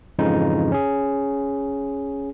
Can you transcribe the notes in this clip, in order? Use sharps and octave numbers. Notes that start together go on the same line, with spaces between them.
F2 G#2 C#3 E3 D#4 F4
C#4 G#4